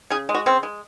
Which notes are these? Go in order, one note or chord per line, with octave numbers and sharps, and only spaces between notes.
C#3 G#4
G#3
F#4
C#3 C4
G#3